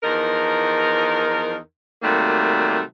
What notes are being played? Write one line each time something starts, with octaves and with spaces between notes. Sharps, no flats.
E2 F3 D#4 A#4
C3 D#3 F#3 G3 A3 A#3